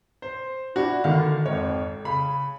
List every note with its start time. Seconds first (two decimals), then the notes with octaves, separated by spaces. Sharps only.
0.22 C5
0.76 D4 E4 F#4
1.04 D3 D#3 F5
1.46 G#1 F2 C#5
2.05 C#3 B5